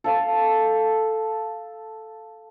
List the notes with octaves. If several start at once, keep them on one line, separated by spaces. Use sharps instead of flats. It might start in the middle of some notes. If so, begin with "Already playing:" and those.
A4 F5 A5